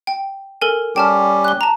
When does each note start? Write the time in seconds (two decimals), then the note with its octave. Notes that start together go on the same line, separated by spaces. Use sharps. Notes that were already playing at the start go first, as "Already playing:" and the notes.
0.07 G5
0.62 A4 A#4 G#5
0.96 G3 C#4 G4 G5 A5 F6
1.45 F#6 G7
1.61 A5 A#5